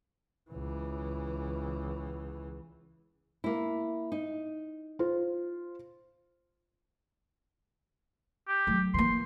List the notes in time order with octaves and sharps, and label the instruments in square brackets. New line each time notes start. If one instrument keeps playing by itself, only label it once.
[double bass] C#2 E3
[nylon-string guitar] A#3 E4
D#4
[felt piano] F4 C5
[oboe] G4
[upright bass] F#3 A3
[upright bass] E3 A#3 [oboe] C6